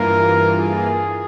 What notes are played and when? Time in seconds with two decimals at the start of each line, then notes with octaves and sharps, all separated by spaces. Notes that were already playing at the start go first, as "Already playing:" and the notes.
Already playing: G2 E3 A#3 F4 A#4
0.58 G#4